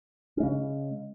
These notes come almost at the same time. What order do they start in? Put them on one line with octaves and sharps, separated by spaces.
C#4 G#3 C#3